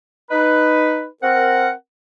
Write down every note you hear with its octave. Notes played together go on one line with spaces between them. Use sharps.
D#4 B4
C4 A#4 F#5